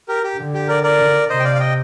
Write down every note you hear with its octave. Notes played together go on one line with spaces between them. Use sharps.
G4 A#4
G4
D3
G4
A#4 D5
A#4 D5
C3 C5 D#5
G5
D5 F5
F5
D#5 G5